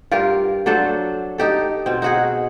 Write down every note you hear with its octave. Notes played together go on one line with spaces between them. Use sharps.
G2 F4 G4 A#4
F#3 D4 A4 C5
D#4 G4 A4
B2 C4
D#4 F#4 G#4